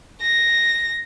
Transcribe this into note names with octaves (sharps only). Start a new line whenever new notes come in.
A#6